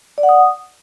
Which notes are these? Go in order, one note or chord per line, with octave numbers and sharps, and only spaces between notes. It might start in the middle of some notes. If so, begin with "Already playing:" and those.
D5
F#5
D#6